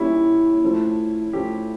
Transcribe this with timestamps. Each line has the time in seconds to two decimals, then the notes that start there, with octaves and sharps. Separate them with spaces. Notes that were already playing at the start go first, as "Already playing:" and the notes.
Already playing: A#2 G3 C#4 E4
0.63 A2 F3 C#4 F4 A4
1.33 A2 F3 C#4 F4 G4 A4